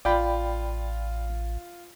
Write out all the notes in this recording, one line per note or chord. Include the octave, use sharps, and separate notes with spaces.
A1 F4 D5 G5 B5